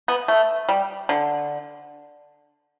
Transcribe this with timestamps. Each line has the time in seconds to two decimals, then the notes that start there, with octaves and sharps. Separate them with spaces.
0.08 B3
0.28 A3
0.69 G3
1.09 D3